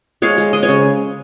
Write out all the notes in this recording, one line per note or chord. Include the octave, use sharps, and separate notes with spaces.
G#3 C#5 F5
G#3
G#3 D#5
C#5
C#3